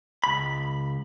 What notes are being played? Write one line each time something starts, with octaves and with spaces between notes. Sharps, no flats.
C#2 B5